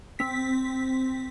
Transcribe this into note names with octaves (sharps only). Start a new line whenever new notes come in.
C4 B6